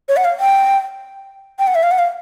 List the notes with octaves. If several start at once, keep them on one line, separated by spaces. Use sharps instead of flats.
C#5
F#5
F5
G5
G5
F#5
E5
F5
F#5
F5